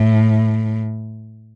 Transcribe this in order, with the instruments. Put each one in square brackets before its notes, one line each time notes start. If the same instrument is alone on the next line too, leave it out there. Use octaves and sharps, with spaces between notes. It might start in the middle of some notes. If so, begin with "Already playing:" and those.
Already playing: [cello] A2